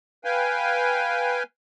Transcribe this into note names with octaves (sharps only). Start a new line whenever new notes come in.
B4 F5 G5 G#5